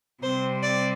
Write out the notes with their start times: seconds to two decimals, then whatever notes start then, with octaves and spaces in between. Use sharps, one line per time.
0.23 C3 G3 C4 C5
0.63 D5